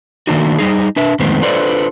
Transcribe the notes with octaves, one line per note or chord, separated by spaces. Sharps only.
D#3 A3 A#3 D4 D#4 F#4
G3 D#4 G#4
D4 B4 E5
F2 A2 D#3 G#3 B3 C4
D4 F4 A4 B4 C5 D5